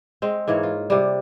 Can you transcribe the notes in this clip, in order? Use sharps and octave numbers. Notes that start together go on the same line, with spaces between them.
G#3 C4
G#2 E3 A#3 C#5
F4
C3 G3